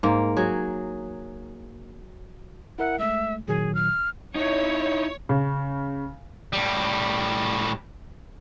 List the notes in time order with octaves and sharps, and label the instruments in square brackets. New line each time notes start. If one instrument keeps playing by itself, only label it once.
[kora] G#2 A#3
F#3 G#4
[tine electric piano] E4 A#4 E5 [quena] F#5
[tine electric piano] G#3 A3 [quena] E5
[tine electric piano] A#2 D#3 F#3 [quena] G#4
[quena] F6
[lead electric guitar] D#4 E4 [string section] C#5
[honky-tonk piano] C#3
[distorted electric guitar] A2 G3